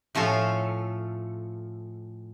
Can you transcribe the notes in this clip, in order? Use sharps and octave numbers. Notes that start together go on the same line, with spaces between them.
A2 F3 C#4 F4 A4